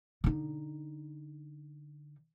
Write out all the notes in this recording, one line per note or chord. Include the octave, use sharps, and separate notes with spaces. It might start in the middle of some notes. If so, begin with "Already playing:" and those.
D3 D#4